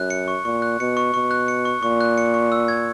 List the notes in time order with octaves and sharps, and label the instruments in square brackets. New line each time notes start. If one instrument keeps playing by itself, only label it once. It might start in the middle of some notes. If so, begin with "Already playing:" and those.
Already playing: [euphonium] F#2 [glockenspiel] F#6
[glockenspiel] C#7
C#6
[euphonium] A#2 [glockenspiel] C#6
[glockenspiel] F#6
[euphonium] B2 [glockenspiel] C#7
[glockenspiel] C#6
[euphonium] B2 [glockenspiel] C#6
[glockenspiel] F#6
C#7
C#6
[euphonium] A#2 [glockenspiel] C#6
[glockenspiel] F#6
C#7
C#6
E6
G#6